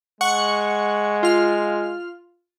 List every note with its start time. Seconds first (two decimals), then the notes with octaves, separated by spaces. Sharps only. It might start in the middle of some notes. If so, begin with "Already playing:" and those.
0.21 G#3 F#5 C#6
1.23 F4 F6